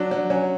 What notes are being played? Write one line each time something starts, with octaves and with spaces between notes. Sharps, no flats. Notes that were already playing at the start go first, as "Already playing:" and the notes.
Already playing: F#3 D4
F#3
F#3 C#4